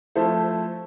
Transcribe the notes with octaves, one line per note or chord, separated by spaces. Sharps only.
F3 A3 E4 A4 C5